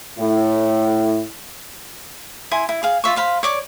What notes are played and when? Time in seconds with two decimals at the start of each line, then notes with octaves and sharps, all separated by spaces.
0.19 A2 E4
2.51 E4 G#5 C6
2.69 E4
2.83 G#4 F5
3.04 F4 E5 C#6
3.16 C5 F5 B5
3.43 C#5 D5 D6